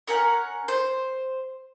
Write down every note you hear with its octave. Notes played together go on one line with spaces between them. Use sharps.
C#4 A#4 F#5 G#5
C5